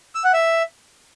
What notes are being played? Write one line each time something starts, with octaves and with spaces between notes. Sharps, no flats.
E6
F#5
E5